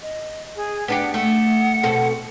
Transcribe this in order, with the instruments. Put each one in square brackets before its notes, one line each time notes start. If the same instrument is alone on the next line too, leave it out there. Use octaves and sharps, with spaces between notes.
[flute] D#5
G#4
[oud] B3 D4 G4 [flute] F#5
[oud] A3 [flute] F#5
[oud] B2 C4 A4